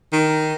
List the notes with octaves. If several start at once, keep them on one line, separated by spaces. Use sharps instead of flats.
D#3